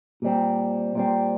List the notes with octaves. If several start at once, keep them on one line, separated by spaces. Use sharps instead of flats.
A#2 G3 C4
A#2 G3 C4